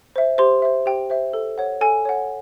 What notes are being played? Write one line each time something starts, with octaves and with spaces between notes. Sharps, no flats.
C5 E5
G4 C5 C6
C5 E5
G4 G5
C5 E5
A4
C#5 F#5
A4 G#5
C#5 F#5